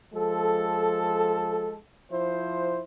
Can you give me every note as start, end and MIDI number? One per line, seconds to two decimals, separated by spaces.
0.13 1.76 53
0.13 1.76 56
0.13 1.76 69
2.12 2.81 53
2.12 2.81 64
2.12 2.81 72